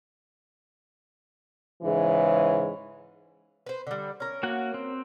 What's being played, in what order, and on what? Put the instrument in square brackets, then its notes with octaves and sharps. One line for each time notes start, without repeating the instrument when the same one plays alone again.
[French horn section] G#2 C#3 E3
[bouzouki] B4 C5
D3 G3
C#4 A#4
[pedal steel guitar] A#3 F#4 F#5
C4